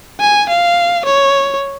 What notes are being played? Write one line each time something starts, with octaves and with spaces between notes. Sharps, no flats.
G#5
F5
C#5